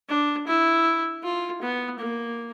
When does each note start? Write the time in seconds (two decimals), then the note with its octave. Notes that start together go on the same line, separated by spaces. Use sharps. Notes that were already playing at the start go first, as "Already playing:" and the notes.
0.09 D4
0.48 E4
1.23 F4
1.62 B3
1.99 A#3